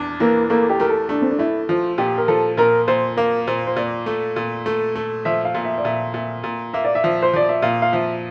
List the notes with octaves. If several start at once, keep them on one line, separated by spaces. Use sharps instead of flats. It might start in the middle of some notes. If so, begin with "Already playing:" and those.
Already playing: E2 D4
E3 A#3
A3 A#3
G4
A3 A#4
A4
A3 D4
C4
D4
A3 E4
F3 F4
A#2 G4
A#4
F3 A4
A#2 A#4
A#2 C5
A#3 A#4
A#2 C5
C5
A#2 D5
A3
A#2
A3
A3
F3 E5
F5
A#2
E5
D5
A#2 E5
A#2 E5
A#2
A#3 E5
D5
E5
F3
C5
F3 D5
E5
A#2 F5
F5
F3 E5